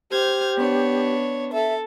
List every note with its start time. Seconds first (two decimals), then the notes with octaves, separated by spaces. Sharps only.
0.11 G4 C5 F6 G#6
0.58 B3 D4 C#5
1.53 A4 E5